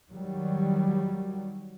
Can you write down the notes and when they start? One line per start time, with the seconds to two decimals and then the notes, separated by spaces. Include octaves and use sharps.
0.10 D#3 F#3 G3